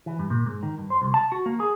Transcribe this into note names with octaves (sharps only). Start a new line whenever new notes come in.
E3
G2
A#2
G#2
D#3
G2
C5
C2
A5
F#4
A#3
G#4